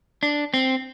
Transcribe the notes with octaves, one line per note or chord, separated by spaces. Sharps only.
D4
C4